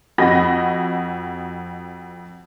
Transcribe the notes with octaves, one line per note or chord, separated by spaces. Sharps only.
F2 F#4 D#5 B5 A#6